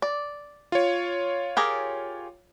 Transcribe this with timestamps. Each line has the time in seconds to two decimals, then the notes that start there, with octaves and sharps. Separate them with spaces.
0.02 D5
0.72 F4 C#5
1.57 G4 G#4 A#4